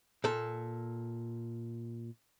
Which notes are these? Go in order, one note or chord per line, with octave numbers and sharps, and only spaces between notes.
A#2 A4